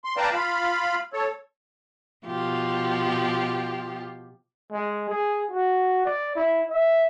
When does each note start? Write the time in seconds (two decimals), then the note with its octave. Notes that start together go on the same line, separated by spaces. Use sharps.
0.04 C6
0.17 B4 D5 F5 G5 A5 A#5
0.33 F4 F5 B5
1.13 A4 C#5
2.26 B2 F3 F4 G4
4.72 G#3
5.09 G#4
5.51 F#4
6.05 D5
6.36 E4
6.70 E5